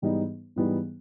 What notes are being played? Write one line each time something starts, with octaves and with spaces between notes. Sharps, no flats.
G#2 E3 G3 B3 D#4
G#2 E3 G3 B3 D#4